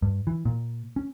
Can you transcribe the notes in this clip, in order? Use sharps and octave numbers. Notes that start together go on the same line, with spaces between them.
G2
E3
A#2
C#4